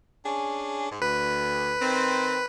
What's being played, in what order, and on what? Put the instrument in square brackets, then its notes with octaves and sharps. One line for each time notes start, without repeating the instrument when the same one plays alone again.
[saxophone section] C#4 D4 G#4
G#2
[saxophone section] D2 [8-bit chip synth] B4
[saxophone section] D#3 C4